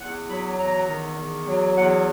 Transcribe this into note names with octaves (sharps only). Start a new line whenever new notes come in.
E2 F#5
F#3 B5
E2 A#5
D#3
E2
F#3
E2 F#5